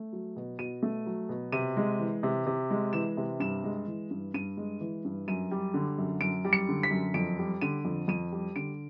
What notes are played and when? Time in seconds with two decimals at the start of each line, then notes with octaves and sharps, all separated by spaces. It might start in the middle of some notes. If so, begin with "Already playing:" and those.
Already playing: A3
0.13 F#3
0.36 B2
0.59 B2 D#7
0.83 A3
1.06 F#3
1.29 B2
1.52 C3 D#7
1.77 G#3
1.99 E3
2.23 C3
2.47 C3
2.70 G#3
2.93 E3 E7
3.17 C3
3.40 G2 E7
3.64 G#3
3.87 E3
4.11 G2
4.34 G2 D#7
4.57 G#3
4.81 E3
5.05 G2
5.28 F#2 D#7
5.51 G3
5.74 D3
5.98 F#2
6.21 F#2 D7
6.45 G3
6.53 C#7
6.69 D3
6.83 B6
6.91 F#2
7.14 F2 D7
7.39 G3
7.61 D3 D#7
7.85 F2
8.08 F2 D#7
8.32 G3
8.56 D3 D7